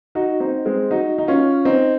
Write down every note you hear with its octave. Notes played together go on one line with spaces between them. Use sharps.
D#4 F#4
C4 D#4
G#3 C4
D#4 F#4
D#4
C#4 F4
C4 D#4